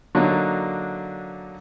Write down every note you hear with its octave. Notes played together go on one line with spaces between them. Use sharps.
D3 F#3 A#3 D4 D#4